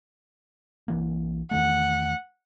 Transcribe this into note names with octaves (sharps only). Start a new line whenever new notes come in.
B1 E3 A#3
E2 D#3 A3 F#5